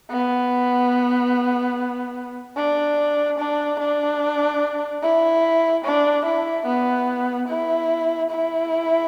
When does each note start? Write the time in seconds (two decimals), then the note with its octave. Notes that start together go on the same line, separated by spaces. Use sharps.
0.10 B3
2.56 D4
3.38 D4
3.79 D4
5.03 E4
5.84 D4
6.25 E4
6.66 B3
7.48 E4
8.30 E4